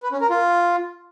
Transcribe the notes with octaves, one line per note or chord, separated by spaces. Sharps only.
B4
C#4
A#4
F4